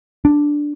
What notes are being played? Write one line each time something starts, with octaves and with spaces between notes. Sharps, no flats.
D4